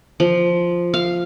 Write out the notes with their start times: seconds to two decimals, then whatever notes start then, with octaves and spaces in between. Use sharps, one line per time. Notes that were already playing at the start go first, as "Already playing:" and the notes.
0.20 F3
0.94 F5